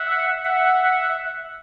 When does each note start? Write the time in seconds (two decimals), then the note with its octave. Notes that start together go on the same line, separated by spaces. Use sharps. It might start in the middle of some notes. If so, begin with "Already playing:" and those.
Already playing: E5 F#5
0.44 E5 F#5